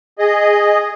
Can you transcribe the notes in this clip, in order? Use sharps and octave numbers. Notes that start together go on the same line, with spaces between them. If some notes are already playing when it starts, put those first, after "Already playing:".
G#4 D#5